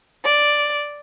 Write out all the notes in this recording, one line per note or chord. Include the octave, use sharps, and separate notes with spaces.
D5